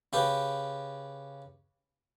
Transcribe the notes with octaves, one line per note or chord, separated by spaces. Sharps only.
C#3 G4 B4